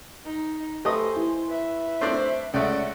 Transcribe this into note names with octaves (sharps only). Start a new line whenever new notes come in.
D#4
A3 G4 A4 B4 C5 D#5 G#5 D#6
E4
B4 E5
A3 C4 D4 C5
C#2 A3 C#4 D5 E5 F#5